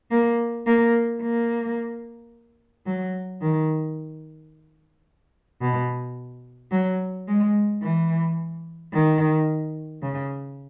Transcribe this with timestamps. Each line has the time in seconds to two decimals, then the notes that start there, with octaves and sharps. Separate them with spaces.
0.11 A#3
0.66 A#3
1.22 A#3
2.86 F#3
3.41 D#3
5.61 B2
6.71 F#3
7.28 G#3
7.82 E3
8.93 D#3
10.02 C#3